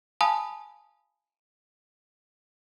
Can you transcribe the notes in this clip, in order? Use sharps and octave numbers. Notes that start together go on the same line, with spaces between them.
F5 G#5 A5 B5 D#6